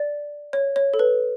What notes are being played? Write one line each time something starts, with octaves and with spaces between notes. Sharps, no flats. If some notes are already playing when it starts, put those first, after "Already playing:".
Already playing: D5
C#5
C#5
A4
B4